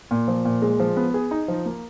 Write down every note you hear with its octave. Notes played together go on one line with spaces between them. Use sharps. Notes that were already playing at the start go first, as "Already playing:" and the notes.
A#2
F3
A#2
G#3
F3
B3
G#4
D#4
F3
A#3